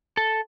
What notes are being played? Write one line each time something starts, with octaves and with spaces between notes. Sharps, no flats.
A4